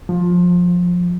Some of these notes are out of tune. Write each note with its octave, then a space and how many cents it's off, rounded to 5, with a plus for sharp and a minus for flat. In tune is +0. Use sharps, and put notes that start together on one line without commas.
F3 +20